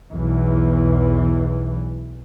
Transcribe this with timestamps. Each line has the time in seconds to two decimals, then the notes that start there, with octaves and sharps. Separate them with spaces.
0.12 B1 E2 E3